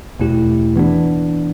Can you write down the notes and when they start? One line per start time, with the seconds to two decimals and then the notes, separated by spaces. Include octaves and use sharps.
0.20 E2 B2 A3 E4 G4
0.76 E3 B3 D4